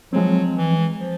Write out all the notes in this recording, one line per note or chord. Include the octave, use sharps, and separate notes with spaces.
F3 F#3 G#3 C4
E3
F3